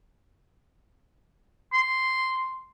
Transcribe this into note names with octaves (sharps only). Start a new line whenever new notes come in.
C6